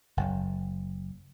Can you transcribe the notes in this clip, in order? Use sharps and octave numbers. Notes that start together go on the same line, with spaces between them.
F#1